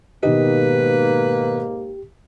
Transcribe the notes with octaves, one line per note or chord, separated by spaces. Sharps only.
G#2 B2 D#3 A#3 G4 B4 D#5